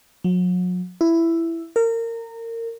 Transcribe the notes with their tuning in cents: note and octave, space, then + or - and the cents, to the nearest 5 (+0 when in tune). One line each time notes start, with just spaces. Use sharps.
F#3 -40
E4 +10
A#4 -25